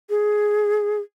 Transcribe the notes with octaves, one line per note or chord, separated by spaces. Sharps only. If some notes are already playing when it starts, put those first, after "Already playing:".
G#4